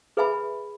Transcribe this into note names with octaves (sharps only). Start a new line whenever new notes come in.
G#4 B4 E5 G#5 B5